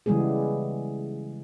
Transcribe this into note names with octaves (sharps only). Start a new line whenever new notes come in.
C#3 E3 G3 G#3 B3 G#4